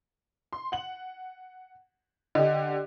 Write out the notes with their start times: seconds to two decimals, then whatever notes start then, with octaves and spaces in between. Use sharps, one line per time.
0.53 C6
0.72 F#5 F#7
2.35 D3 G4 D#5